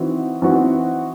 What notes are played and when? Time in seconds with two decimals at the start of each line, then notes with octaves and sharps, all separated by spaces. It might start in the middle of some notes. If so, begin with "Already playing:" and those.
Already playing: E3 C4 D#4 F#4
0.42 E3 C4 D#4 F#4